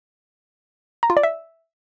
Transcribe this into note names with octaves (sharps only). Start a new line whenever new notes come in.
A#5
F4
D5
E5